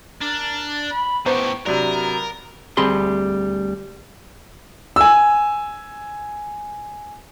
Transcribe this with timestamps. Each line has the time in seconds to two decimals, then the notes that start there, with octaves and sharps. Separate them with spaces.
0.21 D4 A#4
0.91 B5
1.26 A2 B3 G4 C5 A#5 C#6
1.66 C3 F#3 B3 D4 A#4
2.77 D2 G3 C4 G#4 B5 C6
4.96 G#5 E6